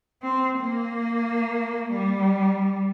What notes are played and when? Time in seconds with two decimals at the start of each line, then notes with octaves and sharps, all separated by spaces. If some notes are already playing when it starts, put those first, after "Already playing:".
0.22 C4
0.58 A#3
1.92 G3